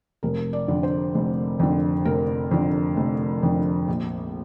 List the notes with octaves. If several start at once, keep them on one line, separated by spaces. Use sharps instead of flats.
F1 A#4
D5
F2 D3
C5
F1
F2 D3
F1 A#4
F2 D3
F1
F2 D3
A#1